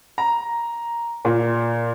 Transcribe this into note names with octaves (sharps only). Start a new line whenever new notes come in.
A#5
A#2